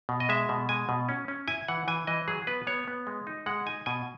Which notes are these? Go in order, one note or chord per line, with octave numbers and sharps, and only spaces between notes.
B2
D#5
G#3 E5
B2
G#3 G#5
B2
C#4
C#4
E4 G#5
E3 F#5
E3 G#5
E3 D#5
F#3 G#4
B3 B4
B3 C#5
B3
G#3
D#4
G#3 F#5
D#4 G#5
B2 G#5